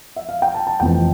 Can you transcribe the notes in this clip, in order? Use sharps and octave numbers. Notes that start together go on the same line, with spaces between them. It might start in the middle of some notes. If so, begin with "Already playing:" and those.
E5
F5
G5
A5
A5
F1 F2 E3 G5